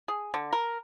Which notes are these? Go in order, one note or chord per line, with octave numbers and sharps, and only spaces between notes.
G#4
D3
A#4